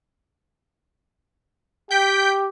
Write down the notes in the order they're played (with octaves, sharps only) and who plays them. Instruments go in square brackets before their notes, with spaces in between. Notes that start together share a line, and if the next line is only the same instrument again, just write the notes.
[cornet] G4 [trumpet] G5 [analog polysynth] G6 B6 D7